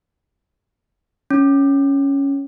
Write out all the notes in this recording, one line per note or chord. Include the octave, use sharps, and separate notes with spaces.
C#4